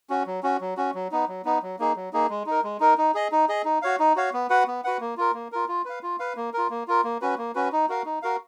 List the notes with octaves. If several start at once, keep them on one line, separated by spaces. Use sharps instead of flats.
C#4 F#4
F#3
C#4 F#4
F#3
C#4 F#4
F#3
B3 D#4
F#3
B3 D#4
F#3
A#3 D#4 G#4
F#3
A#3 D#4 G#4
G#3
D#4 A#4
G#3
D#4 A#4
D#4
G#4 D#5
D#4
G#4 D#5
D#4
F#4 C#5 F5
D#4
F#4 C#5 F5
B3
F#4 B4 F#5
B3
F#4 B4 F#5
A#3
F4 A#4
A#3
F4 A#4
F4
B4 F5
F4
B4 F5
A#3
F4 A#4
A#3
F4 A#4
A#3
C#4 F#4 B4
A#3
C#4 F#4 B4
D#4
F#4 A#4 F5
D#4
F#4 A#4 F5